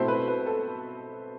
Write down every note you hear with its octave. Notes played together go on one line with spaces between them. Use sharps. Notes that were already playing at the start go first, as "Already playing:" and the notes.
Already playing: B2 A3 C4 E4 C5
B4
B4
A4